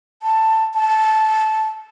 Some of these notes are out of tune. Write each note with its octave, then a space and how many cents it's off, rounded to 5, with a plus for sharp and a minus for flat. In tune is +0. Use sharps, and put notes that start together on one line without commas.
A5 +10
A5 -15